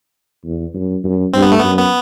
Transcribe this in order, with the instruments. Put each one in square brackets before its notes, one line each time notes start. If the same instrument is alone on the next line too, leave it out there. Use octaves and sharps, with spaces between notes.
[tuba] E2
F#2
F#2
[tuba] G2 [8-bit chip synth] C4
[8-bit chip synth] B3
A3
[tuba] F#2 [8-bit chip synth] B3
[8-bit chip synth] B3